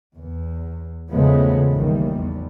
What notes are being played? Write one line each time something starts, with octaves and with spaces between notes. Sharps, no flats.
E2
E2 C#3 F3 G#3 A3 B3
A1 D#2 D#3 E3 G3
E2 F3